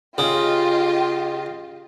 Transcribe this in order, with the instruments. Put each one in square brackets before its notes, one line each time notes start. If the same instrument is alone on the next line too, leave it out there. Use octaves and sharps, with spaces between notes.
[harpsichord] C#3 [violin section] F4 G4 D#5